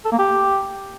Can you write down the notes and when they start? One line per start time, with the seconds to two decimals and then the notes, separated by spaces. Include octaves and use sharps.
0.05 A4
0.12 A#3
0.18 G4